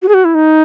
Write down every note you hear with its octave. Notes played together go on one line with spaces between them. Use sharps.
F#4
G#4
F#4
E4
D#4